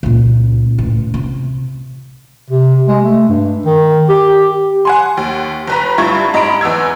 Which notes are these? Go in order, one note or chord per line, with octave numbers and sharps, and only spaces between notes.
C#2 A#2
C#2 A2
C3
C3
G#3
A3
G2
D#3
G4
F#5 G#5 C6
D#2
G1 B4 A#5
G2 E4 F4 C#6 G#6
G#2 D#5 A#5 B5 D7
E2 B3 E6 G#6